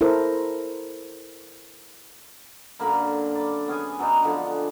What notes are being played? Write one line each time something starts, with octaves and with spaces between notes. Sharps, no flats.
E4 A4 A#4 C5
F#2 D3 A#3 B5
D5 B5
B3 C#4 G#4 G#5
F#3 B3 D4 D#4
D3 F3 B3